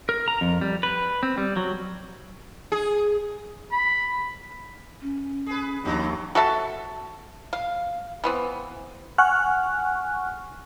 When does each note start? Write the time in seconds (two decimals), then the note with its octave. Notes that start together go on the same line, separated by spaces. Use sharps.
0.09 A#4
0.28 A#5
0.41 F2
0.61 G3
0.83 B4
1.23 C4
1.38 G3
1.57 F#3
2.72 G#4
3.72 B5
5.01 C#4
5.46 G#4 B4
5.85 D#2 F3 D4 F#4
6.35 F#4 A4 E5 A5
7.53 F5
8.24 E3 B3 C4
9.18 F#5 G#5 C#6 F6 F#6